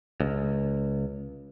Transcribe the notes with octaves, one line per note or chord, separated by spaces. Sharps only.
C#2